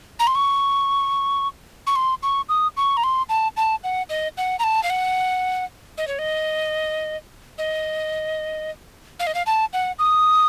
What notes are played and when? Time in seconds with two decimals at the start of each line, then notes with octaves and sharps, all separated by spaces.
0.20 A#5
0.27 C6
0.35 C#6
1.87 C#6
1.96 C6
2.23 C#6
2.49 D#6
2.77 C#6
2.97 A#5
3.04 C6
3.29 A5
3.57 A5
3.84 F#5
4.10 D#5
4.37 F#5
4.59 A#5
4.64 A5
4.83 F5
4.90 F#5
5.98 D#5
6.08 C#5
6.19 D#5
7.58 D#5
9.20 F5
9.27 D#5
9.35 F5
9.46 A5
9.73 F#5
9.99 D#6